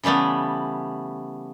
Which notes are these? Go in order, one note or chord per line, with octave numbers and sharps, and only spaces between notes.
C#3 E3 G3 A3 B3